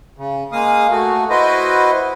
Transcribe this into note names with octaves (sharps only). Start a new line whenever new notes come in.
C#3
G#3 A#3 F5 D#6
A3 F#4
E4 F#4 B4 C5 D#5